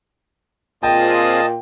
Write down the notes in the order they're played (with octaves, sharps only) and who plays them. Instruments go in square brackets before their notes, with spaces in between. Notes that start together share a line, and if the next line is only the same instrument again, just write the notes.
[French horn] A#2 [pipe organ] C4 F4 G#4 [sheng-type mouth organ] D#5 A5 D#6 [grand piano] G5